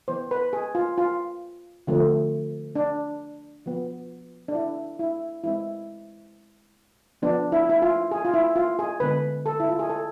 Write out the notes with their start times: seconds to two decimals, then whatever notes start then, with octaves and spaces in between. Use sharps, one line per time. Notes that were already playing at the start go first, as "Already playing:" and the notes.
0.08 E3 B3 C5
0.31 B4
0.53 G#4
0.75 F4
0.98 F4
1.87 D3 F3 A3 C4
2.76 D4
3.66 F3 B3
4.48 D4
4.55 E4
4.99 E4
5.43 E3 G#3 C4 E4
7.22 F3 B3 D4
7.52 E4
7.69 E4
7.82 F4
8.11 G#4
8.25 F4
8.34 E4
8.56 F4
8.79 G#4
9.00 D3 G#3 B3 B4
9.46 A4
9.60 E4
9.69 F4
9.79 G#4
9.90 A4